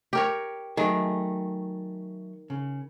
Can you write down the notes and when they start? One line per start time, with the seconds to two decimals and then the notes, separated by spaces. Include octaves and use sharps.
0.13 G4 A#4 C#5
0.77 D#3 F#3 A3 G#4
2.50 C#3